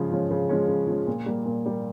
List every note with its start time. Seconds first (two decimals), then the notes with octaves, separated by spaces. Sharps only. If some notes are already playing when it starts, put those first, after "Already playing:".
Already playing: C#3 F3 G#3 C#4
0.11 F3 G#3 C#4
0.31 C#3
0.49 F3 G#3 C#4
0.68 C#3
0.87 F3 G#3 C#4
1.07 A#2
1.26 G3 A#3
1.46 A#2
1.66 G3 A#3